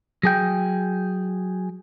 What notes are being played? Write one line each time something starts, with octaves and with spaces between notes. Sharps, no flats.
F#3 G#4 G5